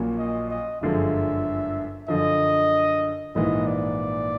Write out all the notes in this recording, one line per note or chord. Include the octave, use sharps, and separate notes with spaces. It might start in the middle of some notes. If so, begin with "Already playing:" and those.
Already playing: A#1 A#2 F#3 A#3 C#4
D#5
D#5
G1 F#2 D3 F3 G#3 E5
F#2 D3 F3 D#5
A#1 G#2 E3 D#5
D5